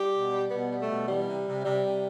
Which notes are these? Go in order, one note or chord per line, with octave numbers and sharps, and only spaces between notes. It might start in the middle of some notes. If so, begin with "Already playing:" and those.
Already playing: G3 G4
B2
G3
B2 B3
G3
A3
B2
E3 G3
C3
C3
C3 G3
C3